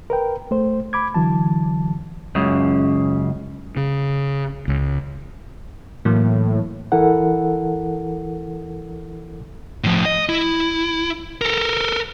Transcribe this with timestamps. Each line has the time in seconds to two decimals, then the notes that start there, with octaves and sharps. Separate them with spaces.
0.10 A#4 B4 G5
0.51 A3 C5
0.93 B5 D6 G#6
1.15 D3 E3 F#3 A5
2.35 C#2 F#2 C#3
3.77 C#3
4.68 C#2
6.05 A2 E3 F#3 A#3
6.92 E3 E4 A4 A#4 F#5
9.84 A2 F3
10.05 D#5
10.29 E4
11.41 A4 A#4